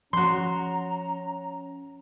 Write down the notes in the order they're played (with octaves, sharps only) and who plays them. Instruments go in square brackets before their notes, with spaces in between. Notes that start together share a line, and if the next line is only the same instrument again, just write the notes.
[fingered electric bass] F3 [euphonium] C#4 [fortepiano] F#4 C6 [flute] A#5